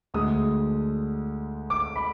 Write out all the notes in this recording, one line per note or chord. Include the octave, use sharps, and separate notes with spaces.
D2 D3 G#3 D#6
D6
B5